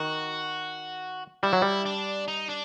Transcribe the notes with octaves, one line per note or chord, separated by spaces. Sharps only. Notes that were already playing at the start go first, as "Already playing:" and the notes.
Already playing: D#3 F#4
G3 E4
F#3
G3
D4
D#4
D4